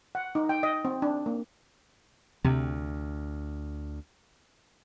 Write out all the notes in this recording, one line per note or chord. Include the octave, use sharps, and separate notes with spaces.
F#5
D#4
G5
D#5
C4
D4
A#3
D2 C3